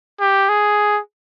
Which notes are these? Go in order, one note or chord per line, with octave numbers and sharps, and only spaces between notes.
G4
G#4